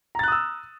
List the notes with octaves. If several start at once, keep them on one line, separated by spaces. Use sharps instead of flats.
A#5 D#6 E6 F#6 A6